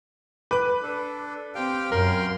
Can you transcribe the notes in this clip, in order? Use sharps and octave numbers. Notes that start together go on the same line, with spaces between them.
B4 D6 F#6
D4 A4
C4 G4 F5 G5
F#2 A#4 F5 G5 C6